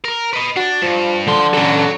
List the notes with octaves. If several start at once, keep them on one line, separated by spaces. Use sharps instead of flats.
A#4
B4 D#5
D4 F#4
G2 F3
D3 F3 C6
F#3 C#4 A4